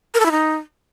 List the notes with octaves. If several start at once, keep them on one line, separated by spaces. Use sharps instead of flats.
A#4
A4
E4
D#4